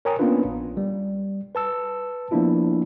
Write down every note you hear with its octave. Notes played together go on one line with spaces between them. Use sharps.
A#4 C#5 G5 G#5 A#5 D#6
A#3 B3 C#4 D4 F4 B4
A#1
G3
B4 A5 E6
F3 A#3 B3 D4 E4 F4